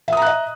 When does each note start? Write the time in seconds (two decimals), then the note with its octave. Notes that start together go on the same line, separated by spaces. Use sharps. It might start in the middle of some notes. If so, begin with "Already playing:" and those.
0.08 E5
0.12 D#6
0.17 A#5
0.22 F#6
0.26 D#5